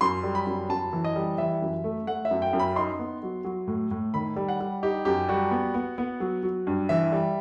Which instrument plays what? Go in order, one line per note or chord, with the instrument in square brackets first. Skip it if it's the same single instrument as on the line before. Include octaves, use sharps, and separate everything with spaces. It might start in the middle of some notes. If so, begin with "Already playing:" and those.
[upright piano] F#2 [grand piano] C6
[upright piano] G3
[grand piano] B5
[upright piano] F#2
[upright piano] F#2 [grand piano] A5
[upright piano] E3
[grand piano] D#5
[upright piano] G3
[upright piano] E3 [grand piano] E5
[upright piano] F#2
A3
[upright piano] A3 [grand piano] F#5
[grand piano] E5
[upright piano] F#2
[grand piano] G5
[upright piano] F#2
[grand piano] B5
[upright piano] D#4 [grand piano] C6
[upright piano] B3
F#3
F#3
A2
A2
[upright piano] D#3 [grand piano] B5
[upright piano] G3
[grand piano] F#5
[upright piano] G3
[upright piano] D#4 [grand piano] G4
[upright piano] F#2 [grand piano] G4
[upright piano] G3 [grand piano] F#4
[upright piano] B3
B3
B3
F#3
F#3
G2
[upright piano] E3 [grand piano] E5
[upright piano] G3